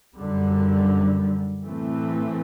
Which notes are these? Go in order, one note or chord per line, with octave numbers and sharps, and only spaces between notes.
F#2 D3 G3
A2 E3 A3 C4